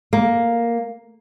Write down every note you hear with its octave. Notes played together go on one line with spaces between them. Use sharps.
A#3